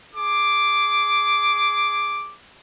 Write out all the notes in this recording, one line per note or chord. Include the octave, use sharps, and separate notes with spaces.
G#4 D6